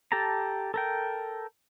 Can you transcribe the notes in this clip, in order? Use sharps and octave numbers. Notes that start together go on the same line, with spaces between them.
G4 A4 A5 A#5
A4 A#4 G5